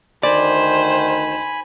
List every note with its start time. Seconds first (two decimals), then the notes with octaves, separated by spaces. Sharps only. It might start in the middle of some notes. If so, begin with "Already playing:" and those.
0.23 D2 D#3 C5 D5 G#5 B5